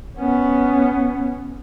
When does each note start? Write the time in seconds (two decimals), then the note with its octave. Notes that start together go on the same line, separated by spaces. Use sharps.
0.18 B3 C#4